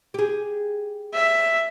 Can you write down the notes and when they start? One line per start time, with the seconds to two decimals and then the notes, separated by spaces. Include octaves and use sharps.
0.14 G4 G#4
1.14 E5